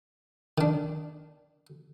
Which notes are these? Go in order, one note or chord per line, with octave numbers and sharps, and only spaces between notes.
D#3 D4